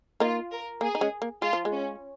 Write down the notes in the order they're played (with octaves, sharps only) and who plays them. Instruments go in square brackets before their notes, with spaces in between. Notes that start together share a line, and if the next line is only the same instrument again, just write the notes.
[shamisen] A#3 D#4 [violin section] F4
[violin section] A#4
[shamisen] A#3 [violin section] G#4
[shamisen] D#4
G#3 C#4
A#3
[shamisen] G#3 [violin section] F4
[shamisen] F3
G#3
[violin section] C#4